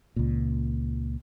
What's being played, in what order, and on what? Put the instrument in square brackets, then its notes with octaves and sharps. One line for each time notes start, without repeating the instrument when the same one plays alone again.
[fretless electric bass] C#2 A#2